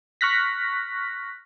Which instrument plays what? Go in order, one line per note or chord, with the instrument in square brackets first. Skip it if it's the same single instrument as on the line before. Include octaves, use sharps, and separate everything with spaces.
[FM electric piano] C#6 F6 F#6 A#6 B6